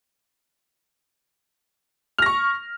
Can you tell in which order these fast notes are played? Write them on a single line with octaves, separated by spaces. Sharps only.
F6 A#6 C#6